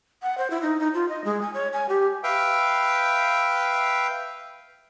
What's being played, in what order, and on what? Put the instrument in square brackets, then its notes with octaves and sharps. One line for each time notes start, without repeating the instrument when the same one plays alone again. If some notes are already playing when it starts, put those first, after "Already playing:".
[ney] F#5
C5
E4
D#4
D#4
F4
D#5
G#3
G#5
C#5
G#5
G4
[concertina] B4 E5 F5 G5